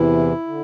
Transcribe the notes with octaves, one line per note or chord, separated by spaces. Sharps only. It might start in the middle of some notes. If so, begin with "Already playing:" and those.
Already playing: E2 C3 E3 E4
D3